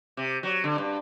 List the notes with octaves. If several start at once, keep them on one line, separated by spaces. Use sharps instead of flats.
C3
F#3
D3
G2